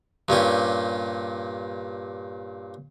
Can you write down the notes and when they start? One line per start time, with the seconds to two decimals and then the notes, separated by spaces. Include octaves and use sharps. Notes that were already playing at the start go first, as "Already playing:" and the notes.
0.28 G2 A#2 C#4 G4